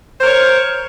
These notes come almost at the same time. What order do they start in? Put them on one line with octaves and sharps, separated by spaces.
C5 A#4 C#5